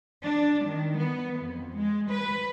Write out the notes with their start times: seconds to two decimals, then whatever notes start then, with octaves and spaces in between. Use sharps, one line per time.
0.22 D4
0.66 D#3
0.98 B3
1.41 F2
1.76 G#3
2.12 B4